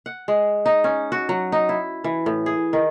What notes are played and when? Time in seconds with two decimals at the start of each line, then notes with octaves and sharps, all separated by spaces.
0.06 F#5
0.28 G#3
0.66 D#4
0.84 C#4
1.12 F#4
1.29 F#3
1.52 D#4
1.69 E4
2.04 E3
2.26 A2
2.46 G#4
2.73 D#3